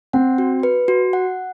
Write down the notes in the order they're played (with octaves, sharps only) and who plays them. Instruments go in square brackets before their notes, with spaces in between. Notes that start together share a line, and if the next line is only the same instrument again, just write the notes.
[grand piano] C4 [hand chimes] F#5
[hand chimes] F#4
B4
F#4
F#5